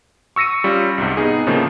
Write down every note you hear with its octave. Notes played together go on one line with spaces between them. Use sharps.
C#6 E6 A#6 C#7 D#7
G3 C#4 F4
C2 G#2 C3
B3 D#4 G#4
A2 C#3 F3 A#3